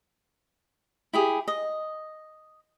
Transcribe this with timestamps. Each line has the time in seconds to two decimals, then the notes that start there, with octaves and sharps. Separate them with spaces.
1.13 E4 G4 G#4
1.48 D#5